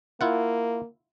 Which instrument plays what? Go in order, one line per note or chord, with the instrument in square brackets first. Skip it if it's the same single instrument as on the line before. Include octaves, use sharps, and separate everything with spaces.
[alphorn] A#3 [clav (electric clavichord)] E4 F4 F#5